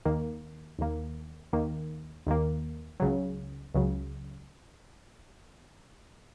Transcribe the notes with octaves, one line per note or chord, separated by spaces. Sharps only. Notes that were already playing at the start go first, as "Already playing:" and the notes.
D#2 D#3 A#3
D#2 D#3 A#3
D#2 D#3 A#3
D#2 D#3 A#3
C#2 C#3 F#3
C#2 C#3 F#3